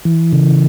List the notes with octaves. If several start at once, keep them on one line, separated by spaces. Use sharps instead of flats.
E3
C#3